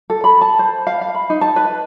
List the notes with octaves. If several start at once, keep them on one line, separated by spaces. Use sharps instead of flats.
A4
B5
A5
C5
F5
F5
B5
D#4
A5
B4